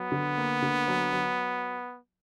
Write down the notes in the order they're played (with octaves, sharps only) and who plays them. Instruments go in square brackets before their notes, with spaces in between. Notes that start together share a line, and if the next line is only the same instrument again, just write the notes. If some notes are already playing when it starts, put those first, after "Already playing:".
Already playing: [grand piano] F#3 [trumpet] B3
[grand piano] D3
A#3
D3
F#3
F#3